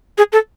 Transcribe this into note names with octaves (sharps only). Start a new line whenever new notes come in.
G#4
A4